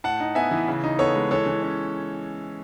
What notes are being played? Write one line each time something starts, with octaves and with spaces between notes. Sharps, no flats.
A2 F#5 A5
D#4
B3 E5 G#5
E3
C#3
D#4
B3 A4 C#5
G#3
E3 A4 C#5
E3
C#4